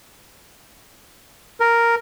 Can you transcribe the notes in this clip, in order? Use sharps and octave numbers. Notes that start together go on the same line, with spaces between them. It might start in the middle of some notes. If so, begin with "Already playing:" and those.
A#4